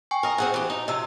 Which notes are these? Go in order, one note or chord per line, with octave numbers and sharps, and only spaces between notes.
G5 G#5 C#6
A#4 D#5
C4 G#4 F#5
E3 G4
D#4
C3 F3 D#5 E6